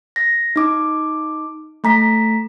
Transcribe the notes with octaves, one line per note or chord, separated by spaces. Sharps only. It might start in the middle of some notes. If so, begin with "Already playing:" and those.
A#6
D#4 D6
A3 A#5 B6